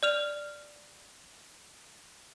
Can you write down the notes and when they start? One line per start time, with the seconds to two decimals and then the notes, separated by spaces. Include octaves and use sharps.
0.03 D5 F6 F7